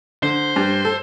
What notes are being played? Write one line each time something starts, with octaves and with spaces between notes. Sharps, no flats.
D3 C5
G2
A4